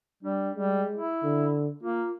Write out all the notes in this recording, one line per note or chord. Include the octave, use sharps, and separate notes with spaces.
G3 D4
G3 G#3
E4
D3
A#3 F4